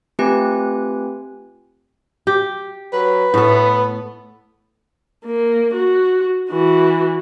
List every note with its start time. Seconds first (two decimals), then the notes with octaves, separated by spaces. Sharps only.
0.19 A3 C4 F4 G4 B4 G#5
2.27 G4
2.93 F#3 B4
3.34 A2 B3 A4
5.26 A#3
5.74 F#4
6.50 E3 F#4